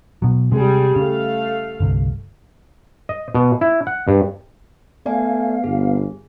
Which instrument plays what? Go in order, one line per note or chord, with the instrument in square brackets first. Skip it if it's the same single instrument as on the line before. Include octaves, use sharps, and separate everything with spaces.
[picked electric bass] B2 F#3
[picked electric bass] C3 G#3 [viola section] G3 G#4
[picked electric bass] C#3 [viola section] A3 F5
[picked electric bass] G1 C2
[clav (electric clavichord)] D#5
B2
E4
F#5
G2
[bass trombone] A3 [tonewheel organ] B3 F5 [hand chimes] D5 G#5
[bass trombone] G1 [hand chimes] G#4